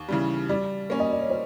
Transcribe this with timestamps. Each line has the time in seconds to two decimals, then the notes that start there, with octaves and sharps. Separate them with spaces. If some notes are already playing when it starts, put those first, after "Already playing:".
Already playing: D#2
0.08 C#3 E3 G3
0.49 G3 D5
0.90 A#3 C#4
1.00 D#5
1.11 D5
1.20 C#5
1.30 C5